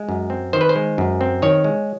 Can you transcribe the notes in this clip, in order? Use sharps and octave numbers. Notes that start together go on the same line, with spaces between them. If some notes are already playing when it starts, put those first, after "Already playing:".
Already playing: G#3
F#2
C4
D#3 C5
B4
C5
G#3
F#2
C4
D#3 C#5
G#3